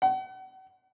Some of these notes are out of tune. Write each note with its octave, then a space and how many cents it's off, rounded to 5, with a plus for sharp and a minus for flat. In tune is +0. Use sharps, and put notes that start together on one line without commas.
F#5 +40